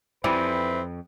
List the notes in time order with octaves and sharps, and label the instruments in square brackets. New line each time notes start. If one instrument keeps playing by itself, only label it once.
[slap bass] F2 [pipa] E3 G3 [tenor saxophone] C4 [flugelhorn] B4